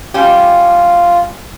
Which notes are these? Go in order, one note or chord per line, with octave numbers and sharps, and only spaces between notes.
G3 C#4 F4 G4